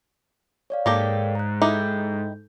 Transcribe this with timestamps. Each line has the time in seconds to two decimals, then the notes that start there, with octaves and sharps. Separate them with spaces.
0.70 C#5 D5 F5
0.86 G#2 A#3 G4 A4
1.35 A#5 F#6
1.62 D#4 E4 G4 A4 G6